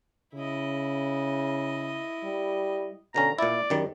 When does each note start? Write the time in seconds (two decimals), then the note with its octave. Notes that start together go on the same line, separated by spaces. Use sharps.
0.35 C#3 E4 D#5
2.24 G3
3.14 B2 D3 C#4 A#5
3.39 A#2 E4 D5
3.70 F#2 D#3 G3